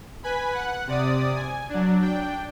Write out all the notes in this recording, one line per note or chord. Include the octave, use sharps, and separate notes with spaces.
B4 G#5 B5
F#5
C3 D5 D#6
G#5
F#3 D4
D4 G5